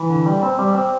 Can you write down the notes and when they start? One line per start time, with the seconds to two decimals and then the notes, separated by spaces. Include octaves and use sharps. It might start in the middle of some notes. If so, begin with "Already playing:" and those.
Already playing: E3
0.10 D3
0.26 G3
0.43 C4
0.59 G3
0.75 C4